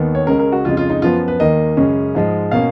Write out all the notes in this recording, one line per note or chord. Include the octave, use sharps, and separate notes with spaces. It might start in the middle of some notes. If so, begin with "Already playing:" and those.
Already playing: D#2 D#3 B3
C#5
C#2 C#3 G#3 C#4 A#4
A#4
F#4
F2 C#3 G#3 F4
F4
D#4
F#2 F3 B3 F4
B4
D#2 D#3 A#3 D#5
F#2 C#3 G#3 C#4
G#2 F3 G#3
B2 A#3 C#4 F5